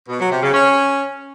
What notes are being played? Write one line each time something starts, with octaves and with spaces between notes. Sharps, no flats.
B2
F#3
C3
C#3
C#4